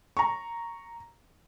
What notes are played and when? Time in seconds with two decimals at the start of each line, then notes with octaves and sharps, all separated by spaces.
0.17 A#5 C#6